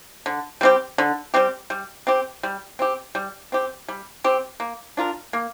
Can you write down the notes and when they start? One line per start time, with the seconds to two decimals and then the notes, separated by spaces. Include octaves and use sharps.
0.26 D3
0.61 G3 C4 G4
0.98 D3
1.34 G3 C4 G4
1.70 G3
2.07 C4 G4
2.43 G3
2.79 C4 G4
3.15 G3
3.52 C4 G4
3.88 G3
4.24 C4 G4
4.60 A#3
4.97 D4 F4 A#4
5.33 A#3